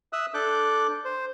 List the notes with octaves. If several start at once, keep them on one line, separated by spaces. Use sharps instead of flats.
E5 D#6 E6 F#6
D4 A4 D6 F#6 G6
C5